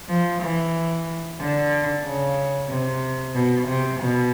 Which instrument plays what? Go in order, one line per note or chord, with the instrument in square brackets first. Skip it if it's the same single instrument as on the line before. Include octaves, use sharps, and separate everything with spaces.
[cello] F3
E3
D3
C#3
C3
B2
C3
B2